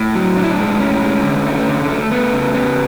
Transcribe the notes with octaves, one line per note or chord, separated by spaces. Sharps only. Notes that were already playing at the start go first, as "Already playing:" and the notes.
Already playing: A2
F#3
A2 D4
E4
D4
G#3
A2 C#4
G#3
D3
A3
D3
A3
A3 B3
C#3
C#3 B3